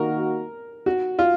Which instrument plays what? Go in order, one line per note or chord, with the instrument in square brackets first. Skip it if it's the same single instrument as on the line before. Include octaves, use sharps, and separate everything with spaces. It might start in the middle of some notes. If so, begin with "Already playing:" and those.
Already playing: [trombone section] D#3 A#3 D#4 F#4 [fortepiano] A#4
[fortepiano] F#4
F4